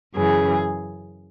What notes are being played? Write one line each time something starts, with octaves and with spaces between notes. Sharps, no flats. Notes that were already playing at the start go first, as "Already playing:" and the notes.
F#2 C#3 E3 G#4